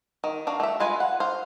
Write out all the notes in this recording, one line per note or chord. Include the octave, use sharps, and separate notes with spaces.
D#3
D4 F#4 F5
A3 E5
G#3 F4 B4 G#5
F#5
C5 F5